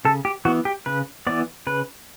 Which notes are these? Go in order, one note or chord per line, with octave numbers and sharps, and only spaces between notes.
C#3 A4
G4
E3 B3 F#4
G4
C#3 B4
E3 B3 D5
C#3 B4